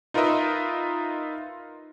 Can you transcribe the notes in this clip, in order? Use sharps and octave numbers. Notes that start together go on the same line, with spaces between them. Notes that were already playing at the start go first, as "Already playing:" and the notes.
D#4 F4 A#4 B4 D#5 E5